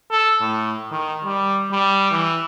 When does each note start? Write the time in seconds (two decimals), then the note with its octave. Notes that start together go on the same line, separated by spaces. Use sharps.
0.11 A4
0.41 A2
0.91 D#3
1.25 G3
1.72 G3
2.11 E3